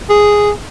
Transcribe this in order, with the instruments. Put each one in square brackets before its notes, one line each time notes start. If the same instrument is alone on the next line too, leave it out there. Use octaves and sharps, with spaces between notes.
[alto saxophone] G#4